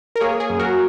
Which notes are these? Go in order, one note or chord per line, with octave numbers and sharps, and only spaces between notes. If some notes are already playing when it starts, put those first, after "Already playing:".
A#4
A#3 G#4 C#5
G#4
F#2
F#4 A#4